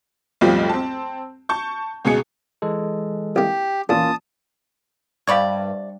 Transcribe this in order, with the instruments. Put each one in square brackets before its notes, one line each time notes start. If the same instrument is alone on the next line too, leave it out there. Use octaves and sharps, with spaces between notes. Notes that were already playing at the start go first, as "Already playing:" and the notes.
[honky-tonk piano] B1 F2 A2 F3 G3 F4
C4 A5
A5 C#6 G6
C#2 B2 G#4 C#7
[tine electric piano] E3 G#3 A4
[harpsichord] C2 A#3 [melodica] G4
[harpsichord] E2 A#2 [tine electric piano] A#3 C#4 F4 [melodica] A5 D#6
[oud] G2 [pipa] C3 D5 C#6 [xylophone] F5 B5 G#6